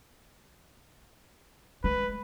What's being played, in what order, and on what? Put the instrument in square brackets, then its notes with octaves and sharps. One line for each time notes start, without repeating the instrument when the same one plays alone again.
[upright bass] G#3 [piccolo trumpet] B4